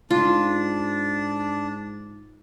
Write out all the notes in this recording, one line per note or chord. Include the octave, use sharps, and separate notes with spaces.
G#2 D4 F4